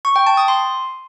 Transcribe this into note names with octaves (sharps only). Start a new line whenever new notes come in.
C#6
G5
A5
D#6
C6